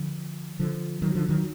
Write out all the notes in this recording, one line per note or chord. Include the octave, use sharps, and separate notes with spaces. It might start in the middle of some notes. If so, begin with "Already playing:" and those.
Already playing: D3 F3
D3 F3
D#3 F#3
D3 F3
D#3 F#3